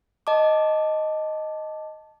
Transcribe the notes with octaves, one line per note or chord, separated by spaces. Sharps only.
D#5 A5 D6